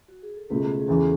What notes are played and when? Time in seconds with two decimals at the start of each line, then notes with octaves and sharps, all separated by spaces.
0.08 F#4
0.22 G#4
0.36 A4
0.50 C#2 B2 A3 G#4 B4
0.80 G#4
0.87 E2 C#3 E3 F#4 A4